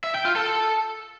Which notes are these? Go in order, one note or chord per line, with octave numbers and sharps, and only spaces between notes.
E5
G5
F4
A4